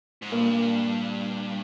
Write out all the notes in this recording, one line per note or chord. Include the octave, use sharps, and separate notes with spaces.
G#2
G2 A#2 A#3